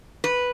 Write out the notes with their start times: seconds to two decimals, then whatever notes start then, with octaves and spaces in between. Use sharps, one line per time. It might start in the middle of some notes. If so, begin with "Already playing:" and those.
0.24 B4